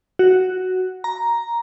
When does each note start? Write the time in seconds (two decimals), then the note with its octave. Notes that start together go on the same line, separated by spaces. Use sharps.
0.19 F#4
1.04 A#5